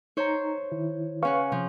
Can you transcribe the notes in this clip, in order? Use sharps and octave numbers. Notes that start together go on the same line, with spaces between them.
D#4 C5 C#5 A#5
D#3 E4
C#3 C#4 B4 F5 F#5 C#6
C3 F3